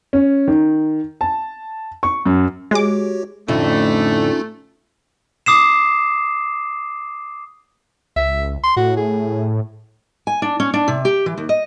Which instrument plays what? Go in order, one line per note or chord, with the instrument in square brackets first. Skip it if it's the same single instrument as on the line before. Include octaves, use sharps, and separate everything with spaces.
[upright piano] C#4
D#3
A5
C#6
F#2
[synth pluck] G#3 D6 [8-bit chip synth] F#4 G4 C#5
[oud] F2 A2 D3 [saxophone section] A3 [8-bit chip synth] C#4 D#4 F4
[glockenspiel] D6 D#6 C7 E7
[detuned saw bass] C#2 [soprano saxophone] E5
[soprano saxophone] C6
[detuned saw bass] A2 [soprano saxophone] F#4
[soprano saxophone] G#4
[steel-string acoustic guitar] G#5
D4
C#4
D4
C3
G4
E3
D#2
D#5